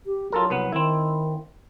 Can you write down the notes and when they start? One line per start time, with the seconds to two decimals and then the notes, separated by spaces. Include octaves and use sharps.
0.06 G4
0.32 F#3 F4 A4 A#4
0.50 C2 B3 B4
0.72 D#3 C4 E4